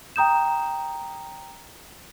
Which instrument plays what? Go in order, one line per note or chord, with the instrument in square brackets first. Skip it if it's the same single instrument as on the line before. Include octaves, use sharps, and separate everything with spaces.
[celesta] G5 A#5 D#6 G6 E7